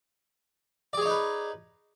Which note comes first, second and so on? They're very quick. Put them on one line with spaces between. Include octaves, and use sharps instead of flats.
D5 G#4 C#5 D#4 B4